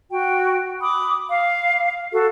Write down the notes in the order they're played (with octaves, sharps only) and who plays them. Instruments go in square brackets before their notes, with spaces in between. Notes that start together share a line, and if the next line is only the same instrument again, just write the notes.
[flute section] F#4 G5
B5 D6 D#6
F5
F#4 A4